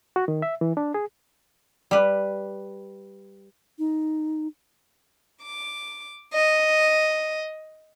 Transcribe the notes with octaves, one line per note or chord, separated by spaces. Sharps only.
F#4
D#3
E5
E3
D4
G#4
G3 B4
D#4
D6
D#5